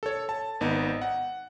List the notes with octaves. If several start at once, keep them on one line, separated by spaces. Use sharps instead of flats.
A4 C#5
A5
G#1 B3 D#4
F#5